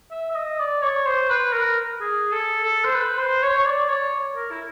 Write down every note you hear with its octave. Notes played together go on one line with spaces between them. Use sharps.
E5
E5
D#5
D5
C#5
C5
B4
A#4
G#4
A4
A4
C5
B4
C5
C#5
C#5
D5
C#5
A#4
E4